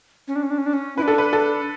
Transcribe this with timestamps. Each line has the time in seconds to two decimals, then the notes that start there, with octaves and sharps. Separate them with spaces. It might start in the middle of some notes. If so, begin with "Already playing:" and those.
0.28 C#4
0.36 D4
0.43 C#4
0.50 D4
0.58 C#4
0.66 D4
0.73 C#4
0.98 E4 B4
1.02 D4
1.08 A4
1.18 B4
1.33 A4